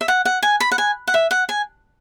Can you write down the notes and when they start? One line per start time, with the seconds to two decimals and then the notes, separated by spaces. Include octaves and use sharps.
0.01 E5
0.08 F#5
0.25 F#5
0.43 G#5
0.60 B5
0.72 F#5
0.78 G#5
1.07 F#5
1.14 E5
1.31 F#5
1.49 G#5